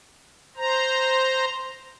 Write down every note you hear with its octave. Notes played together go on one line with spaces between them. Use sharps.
C5 A#5